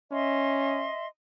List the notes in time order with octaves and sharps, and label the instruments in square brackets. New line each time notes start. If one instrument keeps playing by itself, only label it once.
[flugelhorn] C#4 [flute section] D#5 E5 C6